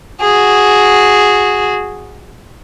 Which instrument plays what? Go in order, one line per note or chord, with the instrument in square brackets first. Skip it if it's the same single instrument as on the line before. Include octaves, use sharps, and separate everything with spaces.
[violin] F#4 G#4